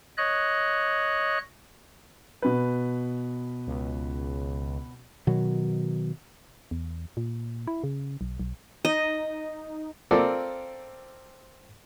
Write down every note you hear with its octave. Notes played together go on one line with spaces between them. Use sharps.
C#5 D#5 F#6
B2 B4
C#2
B2 D#3 F#3
E2
A#2
E4
C#3
B1
B1
D#4 D#5
C4 F4 A4 A#4 D5